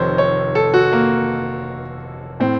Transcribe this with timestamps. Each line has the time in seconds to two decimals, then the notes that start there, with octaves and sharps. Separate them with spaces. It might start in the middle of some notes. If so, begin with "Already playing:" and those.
Already playing: F1 F2 C3 D#3 C5 C#5
0.18 C#5
0.55 A4
0.74 F#4
0.92 A#3
2.40 A2 C4